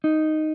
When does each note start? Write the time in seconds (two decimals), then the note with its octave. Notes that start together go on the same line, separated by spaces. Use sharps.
0.04 D#4